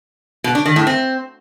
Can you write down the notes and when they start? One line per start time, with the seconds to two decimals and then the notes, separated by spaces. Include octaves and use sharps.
0.44 B2
0.55 D4
0.66 D#3
0.76 A2
0.87 C4